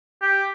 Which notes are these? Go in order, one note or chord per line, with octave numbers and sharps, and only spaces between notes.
G4